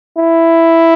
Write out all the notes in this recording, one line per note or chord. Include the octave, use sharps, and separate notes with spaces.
E4